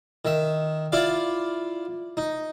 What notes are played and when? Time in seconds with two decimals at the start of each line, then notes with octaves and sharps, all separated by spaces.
0.25 D#3 E5
0.92 E4 F4 D5 F5
2.17 D#4